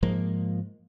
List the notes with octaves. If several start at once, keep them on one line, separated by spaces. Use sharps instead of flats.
G#2 F3 G#3 A#3